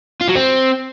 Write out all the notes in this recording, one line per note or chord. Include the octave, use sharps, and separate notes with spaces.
F4
F#3
C4